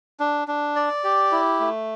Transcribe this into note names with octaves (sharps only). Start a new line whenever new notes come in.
D4
D4
D5
G4
E4
A3